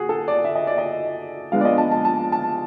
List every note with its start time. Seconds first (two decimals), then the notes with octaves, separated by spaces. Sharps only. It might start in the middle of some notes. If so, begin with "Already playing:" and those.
Already playing: F#4 G#4
0.09 A4
0.28 D5
0.44 E5
0.55 D#5
0.67 D5
0.78 D#5
1.52 F3 G#3 B3 D4 F5
1.61 D5
1.65 D#5
1.78 A5
1.91 A5
2.05 A5
2.32 A5